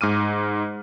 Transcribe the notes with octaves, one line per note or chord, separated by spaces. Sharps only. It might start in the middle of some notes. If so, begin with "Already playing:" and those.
G#2 D6 F6 D#7